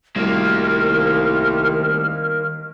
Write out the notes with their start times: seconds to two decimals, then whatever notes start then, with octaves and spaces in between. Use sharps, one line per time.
0.16 C2 D#3 G3 A3 A#3 F#4 F6